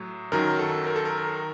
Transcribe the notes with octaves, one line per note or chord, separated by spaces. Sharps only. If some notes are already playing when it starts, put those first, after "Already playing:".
Already playing: A2 F#3
F#2 D#3 F#3 A#4
A4
A#4
A4
A#4